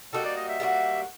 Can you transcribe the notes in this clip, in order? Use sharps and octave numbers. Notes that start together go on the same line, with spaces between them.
G3 A#3 D#4 F#4 A4
D5
D#5
E5
G3 A#3 D#4 F#4